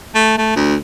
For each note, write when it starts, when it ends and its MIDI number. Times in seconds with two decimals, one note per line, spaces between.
0.15 0.38 57
0.38 0.56 57
0.56 0.75 38